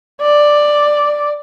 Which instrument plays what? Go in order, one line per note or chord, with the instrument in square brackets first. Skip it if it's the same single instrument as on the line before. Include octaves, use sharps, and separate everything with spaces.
[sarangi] D5